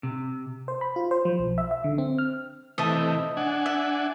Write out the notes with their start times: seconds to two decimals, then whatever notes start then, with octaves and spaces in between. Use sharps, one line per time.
0.03 C3
0.68 C5
0.81 B5
0.96 F4
1.11 C5
1.25 F3
1.39 B1
1.58 E5
1.71 E5
1.84 D3
1.98 C4
2.18 F6
2.78 C3 E3 A3 D#5 E5 A5
3.37 D4 F#5 G#5
3.66 E5